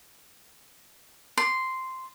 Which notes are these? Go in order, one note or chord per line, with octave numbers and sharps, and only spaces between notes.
C6